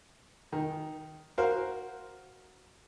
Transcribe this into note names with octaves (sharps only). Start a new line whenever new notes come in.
D#3
F#4 A#4 C5 F5